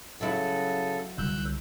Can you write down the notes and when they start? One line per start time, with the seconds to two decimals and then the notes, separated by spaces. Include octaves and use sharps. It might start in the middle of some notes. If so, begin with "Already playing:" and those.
0.21 C#3 F#3 E4 A4
1.18 C2 D3 E6 F#6 G6